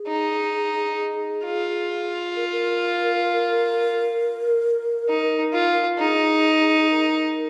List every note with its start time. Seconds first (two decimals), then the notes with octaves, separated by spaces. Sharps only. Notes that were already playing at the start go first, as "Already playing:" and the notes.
Already playing: G#4
0.08 D#4
1.45 F4
2.36 A#4
2.52 A#4
5.09 D#4
5.53 F4
5.99 D#4 G#4
6.82 G#4
6.90 A#4